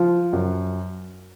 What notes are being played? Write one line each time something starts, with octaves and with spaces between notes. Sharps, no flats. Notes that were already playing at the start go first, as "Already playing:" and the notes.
Already playing: F3
F#2